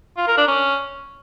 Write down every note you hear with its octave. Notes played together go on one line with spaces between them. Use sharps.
F4
A#4
D4
C#4